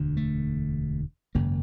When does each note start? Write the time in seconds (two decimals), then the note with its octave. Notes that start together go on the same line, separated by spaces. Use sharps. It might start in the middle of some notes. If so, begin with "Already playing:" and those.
Already playing: E1 D2 D3
0.17 A3
1.35 G#1 F#2 C#3 A#3